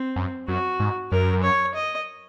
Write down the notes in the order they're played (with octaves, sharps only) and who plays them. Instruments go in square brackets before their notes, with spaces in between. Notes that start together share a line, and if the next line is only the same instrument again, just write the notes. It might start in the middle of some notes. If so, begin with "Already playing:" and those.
Already playing: [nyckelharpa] C4
[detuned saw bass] F#2
[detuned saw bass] F#2 [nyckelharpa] F#4
[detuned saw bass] G#2
[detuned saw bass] F#2 [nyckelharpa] A#4
[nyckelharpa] C#5
D#5